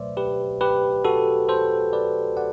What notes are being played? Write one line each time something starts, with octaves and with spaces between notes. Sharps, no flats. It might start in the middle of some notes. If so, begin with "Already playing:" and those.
Already playing: B2 F#3 A3 B4 C5 D5 E5
G4 B4
G4 B4
F#4 A4
A4 C5
B4 D5
D5 F#5